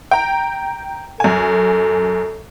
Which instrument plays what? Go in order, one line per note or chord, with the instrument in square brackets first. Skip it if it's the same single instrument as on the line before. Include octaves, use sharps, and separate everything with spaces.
[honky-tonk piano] G5 A#5
[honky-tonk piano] F#2 G#5 [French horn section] A4